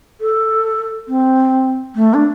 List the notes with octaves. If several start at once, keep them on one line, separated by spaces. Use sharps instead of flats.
A4
C4
A3
D4